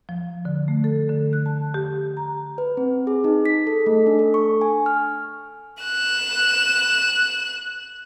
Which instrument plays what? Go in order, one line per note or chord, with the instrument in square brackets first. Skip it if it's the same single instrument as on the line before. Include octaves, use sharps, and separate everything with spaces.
[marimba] F3
D3
A3
A4
D3
F#6
A5
G4
A#5
[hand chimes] B4
C4
G#4
D#4
B6
A4
A3
D4
A4
C#6
G#5
F6
[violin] F#6 E7